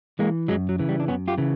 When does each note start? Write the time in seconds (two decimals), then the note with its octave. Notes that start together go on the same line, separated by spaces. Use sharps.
0.19 E3 G#3 A#3
0.48 F#2 F#3 G#3
0.69 F#3
0.79 C#3 E3
0.89 G3
1.00 D4
1.08 F#2 B3 C#4
1.28 F4 G4
1.38 C#3 E3